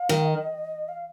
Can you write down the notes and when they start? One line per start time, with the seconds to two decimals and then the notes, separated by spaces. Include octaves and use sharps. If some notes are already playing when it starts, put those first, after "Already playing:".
Already playing: F5
0.09 D#3
0.25 D#5
0.88 F5